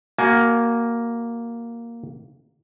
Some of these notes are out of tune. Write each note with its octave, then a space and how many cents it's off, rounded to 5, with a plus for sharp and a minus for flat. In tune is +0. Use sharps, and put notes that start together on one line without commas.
A#3 +0 F#4 +20 G#5 +25